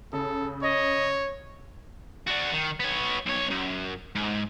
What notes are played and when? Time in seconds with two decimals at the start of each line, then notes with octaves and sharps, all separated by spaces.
0.13 C#3 A4
0.62 C#5 D#5
2.28 D4 F#4
2.53 D#3
2.80 B3 C#5
3.26 B1 C#5
3.51 F#2
4.15 G#2